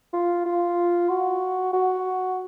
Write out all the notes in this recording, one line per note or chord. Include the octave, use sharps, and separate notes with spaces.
F4
F4
F#4
F#4